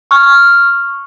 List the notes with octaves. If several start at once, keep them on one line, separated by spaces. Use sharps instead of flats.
C#6 F6